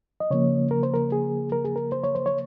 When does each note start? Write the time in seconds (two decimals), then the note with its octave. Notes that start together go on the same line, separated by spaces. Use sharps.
0.20 D#5
0.30 C#3 F3 A#3 C#5
0.71 A#4
0.83 C5
0.94 A#4
1.12 G#4
1.52 A#4
1.64 G#4
1.76 A#4
1.92 C5
2.03 C#5
2.15 C5
2.26 C#5